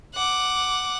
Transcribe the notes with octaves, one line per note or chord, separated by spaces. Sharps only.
F#5 D6